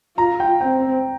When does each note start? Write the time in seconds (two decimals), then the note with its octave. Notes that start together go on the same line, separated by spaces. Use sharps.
0.18 F4 A#5
0.40 G5
0.61 C4 G5